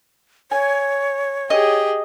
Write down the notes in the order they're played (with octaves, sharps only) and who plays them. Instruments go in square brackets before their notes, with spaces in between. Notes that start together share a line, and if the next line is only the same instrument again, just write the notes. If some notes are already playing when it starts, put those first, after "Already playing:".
[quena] C#5 [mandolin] G#5
[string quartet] G4 G#4 [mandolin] D#5